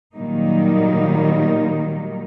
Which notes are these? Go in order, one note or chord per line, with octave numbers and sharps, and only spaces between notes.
A#2 D#3 F#3 G3 A#3 D#4